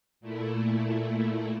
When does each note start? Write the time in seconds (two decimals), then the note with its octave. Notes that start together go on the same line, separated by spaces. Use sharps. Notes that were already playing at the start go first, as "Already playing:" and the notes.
0.21 A#2 A3 E4